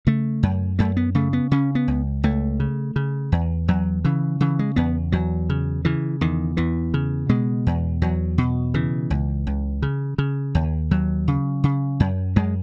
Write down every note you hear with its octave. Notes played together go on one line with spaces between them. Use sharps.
C#3 A3
F#2
F#2 A3
B3
C#3 A3
B3
C#3 C#4
B3
C#2
C#2 A3
C#3
C#3
E2
E2 F#3
C#3 E3
C#3 E3
G#3
E2 B3
E2 F#3
C#3
C#3 E3
E2 D#3
E2 E3
C#3
B2 G#3
E2
E2 F#3
B2
C#3 E3
C#2
C#2
C#3
C#3
D#2
D#2 F#3
C#3
C#3
F#2
F#2 G#3